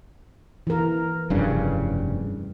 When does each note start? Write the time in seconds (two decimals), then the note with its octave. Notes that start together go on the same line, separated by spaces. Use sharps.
0.67 E3 A#4
1.30 F1 G2 C#3